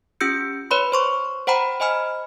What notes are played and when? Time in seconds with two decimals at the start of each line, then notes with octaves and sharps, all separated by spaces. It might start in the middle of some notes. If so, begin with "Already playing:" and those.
0.20 C#4 F4 G4 E6 G6 C#7
0.71 B4 C#5 B5 C6
0.92 C5 C6 C#6
1.47 C5 F#5 G5 A#5 B5
1.80 C5 D#5 G#5 B5 F6